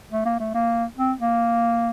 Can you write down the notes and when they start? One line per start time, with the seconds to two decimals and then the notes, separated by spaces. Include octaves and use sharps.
0.12 A3
0.25 A#3
0.40 A3
0.54 A#3
0.98 C4
1.19 A#3